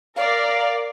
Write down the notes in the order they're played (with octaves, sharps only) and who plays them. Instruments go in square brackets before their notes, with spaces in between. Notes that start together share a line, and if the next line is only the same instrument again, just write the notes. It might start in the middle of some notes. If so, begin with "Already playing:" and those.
[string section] A#4 D5 [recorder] F5